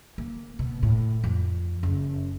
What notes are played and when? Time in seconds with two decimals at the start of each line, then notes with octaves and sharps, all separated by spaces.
0.18 A#3
0.59 B2
0.83 A2
1.24 F2
1.83 F#1